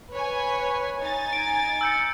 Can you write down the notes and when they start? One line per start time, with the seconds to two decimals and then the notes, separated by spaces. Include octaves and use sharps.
0.11 B4 C#5 G#5
0.99 D#4 G#5 A6
1.33 D7
1.81 E6 G6 C#7